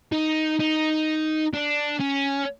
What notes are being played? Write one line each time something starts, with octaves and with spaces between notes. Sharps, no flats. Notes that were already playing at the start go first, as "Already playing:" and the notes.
D#4
D#4
D4
C#4